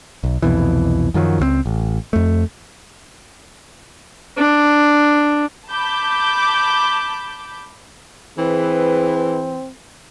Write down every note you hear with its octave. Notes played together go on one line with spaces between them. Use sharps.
B1
C2 F2 B2 E3
F#2 D#3 F3 F#3
C#2 F#3 C4
A1
F2 A3
D4
A5 B5 D6 G6
E3 C4 G#4 B4